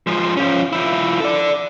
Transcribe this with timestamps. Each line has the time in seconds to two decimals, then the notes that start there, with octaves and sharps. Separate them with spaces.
0.07 F3 G#3
0.37 F3 C#4
0.73 F3 E4
1.20 A4 D5